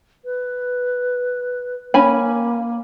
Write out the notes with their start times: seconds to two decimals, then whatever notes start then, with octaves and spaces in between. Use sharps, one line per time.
0.25 B4
1.94 A#3 C#4 G#5 B5